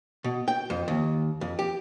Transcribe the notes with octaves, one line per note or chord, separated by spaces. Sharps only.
B2
G5
F2
D#2
F2
G4